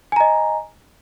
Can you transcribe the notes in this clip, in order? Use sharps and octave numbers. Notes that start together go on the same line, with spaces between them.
D#5 G#5 A#5